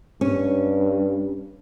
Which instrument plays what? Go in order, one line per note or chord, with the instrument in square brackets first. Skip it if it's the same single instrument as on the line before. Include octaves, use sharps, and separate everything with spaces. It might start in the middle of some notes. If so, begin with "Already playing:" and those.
[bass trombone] G2 [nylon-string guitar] C#4